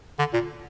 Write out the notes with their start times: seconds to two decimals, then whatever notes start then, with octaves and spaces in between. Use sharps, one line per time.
0.19 D3
0.33 A#2